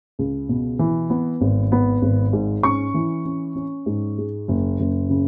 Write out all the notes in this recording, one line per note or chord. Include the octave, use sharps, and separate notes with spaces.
C#2
B2
E3
B3
G#1
B3
G#1
G#2
C#4 C#6
E3
C#4
C#4
G#2
G#3
F#1
F#1
C#3